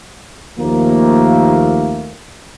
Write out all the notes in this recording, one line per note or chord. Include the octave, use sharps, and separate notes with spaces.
D#2 F3 A3 A#3